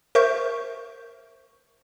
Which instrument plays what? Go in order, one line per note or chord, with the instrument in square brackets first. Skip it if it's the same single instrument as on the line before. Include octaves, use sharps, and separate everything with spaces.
[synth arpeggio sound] A#4 C5 E5 C#6 G6